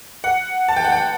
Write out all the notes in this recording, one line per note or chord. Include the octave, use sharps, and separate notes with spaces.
F#5
A5
G5
F#5
G5